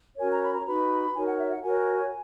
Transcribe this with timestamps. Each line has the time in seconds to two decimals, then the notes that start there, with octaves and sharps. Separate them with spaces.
0.17 C#4 F#4 A#4 C#5 G#5
0.32 A#5
0.42 B5
0.54 A#5
0.66 D#4 F#4 B4 B5
1.14 D#4 F#4 A#4 C#5 G#5
1.26 F#5
1.39 E5
1.51 F#5
1.63 F#4 A#4 C#5 G#5